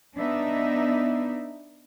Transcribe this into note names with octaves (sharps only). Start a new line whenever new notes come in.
B3 D4 D#4 E5